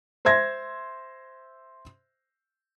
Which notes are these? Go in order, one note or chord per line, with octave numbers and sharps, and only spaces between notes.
C5 E5 C6 G#6 A#6